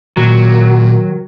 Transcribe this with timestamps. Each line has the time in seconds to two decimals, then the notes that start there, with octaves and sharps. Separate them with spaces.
0.17 A#2 D#3 F#3